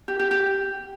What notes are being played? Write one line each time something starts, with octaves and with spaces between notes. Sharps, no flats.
G4
G4
G4